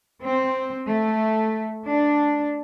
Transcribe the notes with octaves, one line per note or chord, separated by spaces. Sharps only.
C4
A3
D4